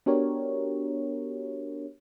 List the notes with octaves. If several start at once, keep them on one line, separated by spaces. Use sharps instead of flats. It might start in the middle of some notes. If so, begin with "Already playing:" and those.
B3 D4 F#4 G4 A#4 C#5